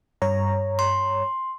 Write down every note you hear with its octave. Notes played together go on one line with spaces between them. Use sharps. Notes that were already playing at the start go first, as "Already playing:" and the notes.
G2 C#5 A#5
C6